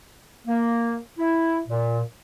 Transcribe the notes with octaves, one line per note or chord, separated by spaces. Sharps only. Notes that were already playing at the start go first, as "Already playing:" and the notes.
A#3
E4
A#2